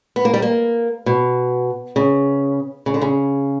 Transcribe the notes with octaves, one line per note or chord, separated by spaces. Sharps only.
B3
A#3
G3
A#3
B2
C#3
C#3
D3
C#3